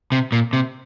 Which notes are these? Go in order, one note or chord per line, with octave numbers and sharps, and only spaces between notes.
C3
A#2
C3